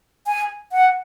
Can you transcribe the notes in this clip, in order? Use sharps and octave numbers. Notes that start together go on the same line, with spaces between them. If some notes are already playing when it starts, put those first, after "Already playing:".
G#5
F#5